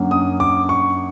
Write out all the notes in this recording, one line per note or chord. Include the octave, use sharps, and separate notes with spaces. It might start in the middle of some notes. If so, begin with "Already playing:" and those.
Already playing: F#2 D3 F#3 A#3
D#6
D6
C#6